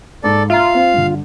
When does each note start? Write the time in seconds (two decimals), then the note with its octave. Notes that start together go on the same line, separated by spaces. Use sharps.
0.24 G#2 A4 D5
0.50 F4 E5 F5 A#5
0.74 C4
0.93 G2 D3